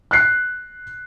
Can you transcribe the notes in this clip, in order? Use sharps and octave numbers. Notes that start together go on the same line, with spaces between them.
F#6 C7